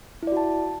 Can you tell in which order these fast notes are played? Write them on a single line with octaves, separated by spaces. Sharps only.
E4 D5 F#4 A5